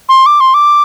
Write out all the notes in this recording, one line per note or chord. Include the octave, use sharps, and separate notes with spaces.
C6
D6
C6
D6